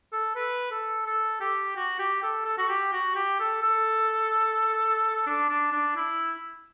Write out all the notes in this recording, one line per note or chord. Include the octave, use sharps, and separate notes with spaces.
A4
B4
A4
A4
G4
F#4
G4
A4
A4
F#4
G4
F#4
G4
A4
A4
D4
D4
D4
E4